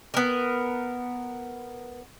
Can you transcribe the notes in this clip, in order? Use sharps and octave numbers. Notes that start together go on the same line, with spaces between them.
B3 A#4